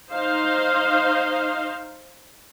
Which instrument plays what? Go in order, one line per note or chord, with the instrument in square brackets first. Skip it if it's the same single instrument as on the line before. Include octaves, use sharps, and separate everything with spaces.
[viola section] D#4 C5 F5